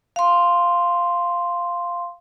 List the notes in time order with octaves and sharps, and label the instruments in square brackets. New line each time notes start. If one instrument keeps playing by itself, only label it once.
[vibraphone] F5 C6